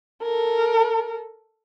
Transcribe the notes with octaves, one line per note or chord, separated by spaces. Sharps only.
A4 A#4